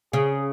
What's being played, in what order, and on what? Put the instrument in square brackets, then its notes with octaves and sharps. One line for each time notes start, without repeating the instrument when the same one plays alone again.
[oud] C#3 [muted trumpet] G#4